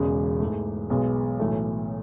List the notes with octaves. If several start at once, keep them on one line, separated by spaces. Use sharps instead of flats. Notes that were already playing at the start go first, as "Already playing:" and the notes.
Already playing: E1 E2 C#3 G#3
G#2 E3 A3
B1 B2 G#3 B3
B1 A2 E3 A3